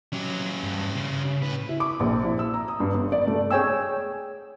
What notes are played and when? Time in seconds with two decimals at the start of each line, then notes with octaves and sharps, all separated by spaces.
0.13 F#3 C#4 G4
0.64 G2
0.96 C#3
1.42 A2 B4
1.69 E4
1.80 D6
2.00 A#1
2.23 E4
2.39 E6
2.54 A#5
2.68 D#6
2.80 G2
2.94 G1
3.12 D5
3.27 A3
3.51 G#4 C#5 G5 G#5 E6